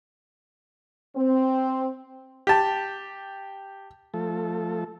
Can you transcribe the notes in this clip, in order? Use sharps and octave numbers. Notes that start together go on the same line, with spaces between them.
C4
G4 A5
F3 A3 A4